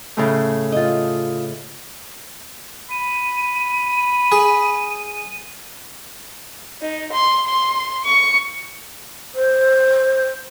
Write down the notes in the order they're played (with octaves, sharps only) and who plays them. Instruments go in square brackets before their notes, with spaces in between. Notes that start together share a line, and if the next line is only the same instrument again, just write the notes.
[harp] A2 C#3 A3
[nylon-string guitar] F4 D#5
[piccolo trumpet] B5 [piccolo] D#7
[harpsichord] G#4
[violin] D#4
C6
C6
C#6
[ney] C5